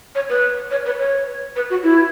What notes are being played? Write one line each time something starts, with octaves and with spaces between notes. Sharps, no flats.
C#5
B4
C#5
B4
C#5
B4
F#4
E4